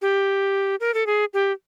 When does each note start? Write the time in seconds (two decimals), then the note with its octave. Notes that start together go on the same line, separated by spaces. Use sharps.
0.02 G4
0.80 A#4
0.94 A4
1.07 G#4
1.34 G4